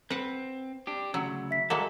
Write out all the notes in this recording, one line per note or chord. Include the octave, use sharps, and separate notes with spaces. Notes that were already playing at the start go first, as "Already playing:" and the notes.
C4 B4 F#5
D4 G4
D2 C#3 F#3 E6
E5 B6
F#3 G#3 A#3 A4 F#5 A#5